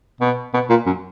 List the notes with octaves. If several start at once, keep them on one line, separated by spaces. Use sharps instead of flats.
B2
B2
A#2
F#2